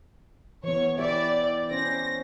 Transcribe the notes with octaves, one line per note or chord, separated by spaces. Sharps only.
E3 B3 C#5
E4 G4 D5 E5
C#4 C5 A#6